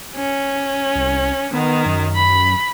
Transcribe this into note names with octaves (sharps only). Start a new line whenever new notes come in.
C#4
C2
D#3 B3
F#2
B5